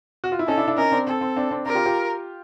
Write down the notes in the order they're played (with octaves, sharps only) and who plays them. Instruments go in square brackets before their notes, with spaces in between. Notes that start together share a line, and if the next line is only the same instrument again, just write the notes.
[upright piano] F#4
F4
E4
[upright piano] C#4 D#4 [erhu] A4
[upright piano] D4 E4
D4 E4
[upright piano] C#4 D#4 [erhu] A#4
[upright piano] C4 D4
[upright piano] C4 [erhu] A4
[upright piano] C4
C4 D4
C4 D4
[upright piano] C4 D4 [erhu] A#4
[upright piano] F4 G4
F4 G4